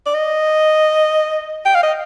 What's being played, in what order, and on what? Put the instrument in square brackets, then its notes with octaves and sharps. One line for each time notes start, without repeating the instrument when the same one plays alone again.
[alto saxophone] D5
D#5
G5
F5
D#5